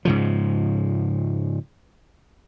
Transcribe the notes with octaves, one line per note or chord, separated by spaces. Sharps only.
G#2 C#3 F3